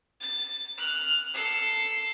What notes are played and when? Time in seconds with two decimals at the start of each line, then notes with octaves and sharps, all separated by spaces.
0.21 A6
0.78 F6 F#6
1.34 A4 C7